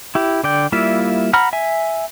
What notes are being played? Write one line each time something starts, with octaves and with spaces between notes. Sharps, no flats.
E4 G4
D3 D5 G5
G3 A#3 E4 F4 E5
F#5 A#5 B5 F6
E5 G#5